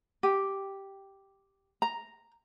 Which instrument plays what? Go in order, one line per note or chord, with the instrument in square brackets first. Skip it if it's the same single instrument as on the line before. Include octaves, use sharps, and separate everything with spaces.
[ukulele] G4
A#5